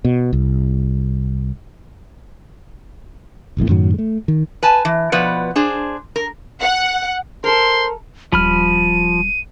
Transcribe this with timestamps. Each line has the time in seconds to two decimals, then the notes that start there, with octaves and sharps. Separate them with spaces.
0.05 B2
0.33 C2
3.57 F1 B1 F2 A2
3.69 F#2 A2 D#3 F#3
3.94 G#3 A3
4.28 D#3
4.63 B4 G#5 A5
4.85 E3
5.12 B2 F3 B3 B4 D5 F#5
5.56 D4 G#4 C5
6.16 A#4
6.60 F#5
7.44 A4 A#4 C5 C6
8.32 D#1 F3 G3 B5 F6 D#7